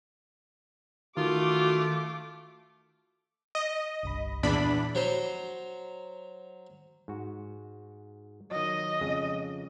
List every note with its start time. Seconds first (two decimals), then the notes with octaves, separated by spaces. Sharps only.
1.17 D#3 A3 F4 F#4 D6
3.55 D#5
4.03 G1 C2 B5
4.43 E2 A#2 D4 B5
4.95 F#3 C5
7.08 G#2 F#4
8.51 D#3 F#3 D#5
9.01 F2 C#3 G#3